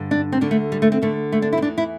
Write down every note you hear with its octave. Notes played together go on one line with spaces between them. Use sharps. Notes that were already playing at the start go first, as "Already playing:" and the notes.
Already playing: G2 D3
D4
C4
D2 D3 D4
A3
G3
A3
C4
D2 D3 A3
A3
D4
E4
C4
E2 E3 D4
E4